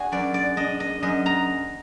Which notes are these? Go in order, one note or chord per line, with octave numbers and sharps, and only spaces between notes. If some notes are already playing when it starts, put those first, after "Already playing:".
Already playing: D4 F#4 G#4
F#2 D5
D5
D4 D#5
D#5
F#2 D#5
A#5